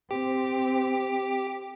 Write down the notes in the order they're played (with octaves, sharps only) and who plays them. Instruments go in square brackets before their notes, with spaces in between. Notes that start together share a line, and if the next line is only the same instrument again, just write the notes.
[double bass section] C4 [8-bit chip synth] G4